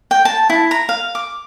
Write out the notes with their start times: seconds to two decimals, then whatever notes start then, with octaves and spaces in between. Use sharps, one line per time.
0.11 G5
0.25 A5
0.50 E4
0.71 A#5
0.89 F5
1.15 D6